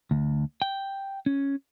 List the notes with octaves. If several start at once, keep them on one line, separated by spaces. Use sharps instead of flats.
D2
G5
C#4